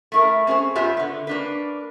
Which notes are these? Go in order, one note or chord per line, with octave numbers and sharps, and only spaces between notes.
A3 E4 A#4
C4 C#4 G#4 C5
G2 B3 F4 G4 E5
D3 B3
A#3 D4 B4